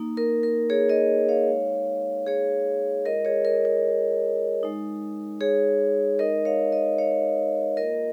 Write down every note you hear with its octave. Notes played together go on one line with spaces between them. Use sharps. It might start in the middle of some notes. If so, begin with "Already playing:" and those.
Already playing: A#3 D#4
A#4
A#4
G#4 C#5
A#4 D#5
C#5 F5
G#3 D#4
G#4 C#5
G#3 F4 A#4 D#5
G#4 C#5
A#4
A#4
G#3 D#4
G#4 C#5
G#3 D#4 A#4 D#5
C#5 F5
A#4 D#5
C#5 F5
A#3 F4 A#4 D#5